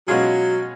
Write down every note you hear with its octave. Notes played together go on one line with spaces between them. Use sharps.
B2 F#3 G#3 C#4 F4 G#4